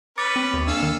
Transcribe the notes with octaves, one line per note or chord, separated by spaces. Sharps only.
C#4 B4 D6 A6 C#7
C4
D#2 A#3
D4 A4 F5 E6
D#3